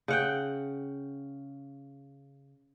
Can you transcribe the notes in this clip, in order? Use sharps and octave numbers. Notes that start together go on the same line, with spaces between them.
C#3 F#5 G5